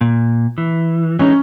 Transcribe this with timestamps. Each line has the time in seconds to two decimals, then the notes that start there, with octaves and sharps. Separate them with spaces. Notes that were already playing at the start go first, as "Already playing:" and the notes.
0.01 A#2
0.58 E3
1.19 E3 G#3 C#4 D#4